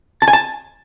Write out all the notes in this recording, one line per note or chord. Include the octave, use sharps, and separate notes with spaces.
A5
G#5
A5